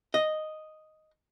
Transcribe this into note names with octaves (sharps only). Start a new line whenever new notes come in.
D#5